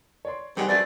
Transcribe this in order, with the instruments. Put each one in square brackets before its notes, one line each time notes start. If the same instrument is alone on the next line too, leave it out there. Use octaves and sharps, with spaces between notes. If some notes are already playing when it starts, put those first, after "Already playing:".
[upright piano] C#5 D5 C6
[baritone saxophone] C3 [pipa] D#3 G#3 F#5 [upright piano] G3 G#4
[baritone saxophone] F#2 [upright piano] F#3 C4 [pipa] A3 B3 F4 [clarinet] D5